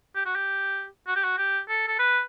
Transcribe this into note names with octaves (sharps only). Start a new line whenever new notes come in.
G4
F#4
G4
F#4
G4
F#4
G4
A4
A4
B4